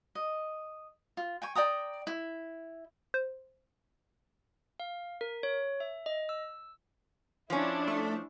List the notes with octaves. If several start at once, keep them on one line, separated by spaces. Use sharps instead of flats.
D#5
F4
G5 G#5 C#6
D5 G5 A#5 D#6
E4
C5
F5
A#4
C#5
E5
D#5
E6
F3 C#4 D4 E4
A3